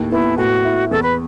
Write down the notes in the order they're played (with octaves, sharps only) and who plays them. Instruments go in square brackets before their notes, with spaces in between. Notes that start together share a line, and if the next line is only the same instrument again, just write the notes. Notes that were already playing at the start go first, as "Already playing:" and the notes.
Already playing: [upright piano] D#2 A2
[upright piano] B3 [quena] E4
[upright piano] A2 [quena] F#4
[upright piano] E4
[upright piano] E2 [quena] A4
[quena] B4